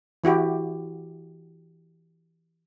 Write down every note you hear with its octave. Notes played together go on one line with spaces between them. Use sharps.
E3 E4 F#4 G4